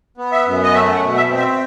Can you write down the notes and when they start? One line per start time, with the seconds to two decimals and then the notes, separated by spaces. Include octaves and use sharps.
0.18 B3
0.31 E5
0.46 F#2
0.63 D#5
0.74 A3 E5
0.95 F#5
1.02 B2
1.16 E5
1.30 C4
1.37 E5